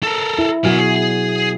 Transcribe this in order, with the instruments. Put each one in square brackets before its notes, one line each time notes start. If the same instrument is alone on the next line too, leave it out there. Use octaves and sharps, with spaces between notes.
[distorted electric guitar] A4 A#4
[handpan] E4
[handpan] B2 F#3 F#4 [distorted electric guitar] A#4 G#5
[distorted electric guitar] G#4